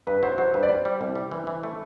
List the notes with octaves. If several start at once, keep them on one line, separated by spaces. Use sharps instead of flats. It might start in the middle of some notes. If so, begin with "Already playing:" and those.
G2 B4
F#3 C5
F#3 C5
G2 B4
D5
G3 C5
G3
C2
G3
E3
E3
A3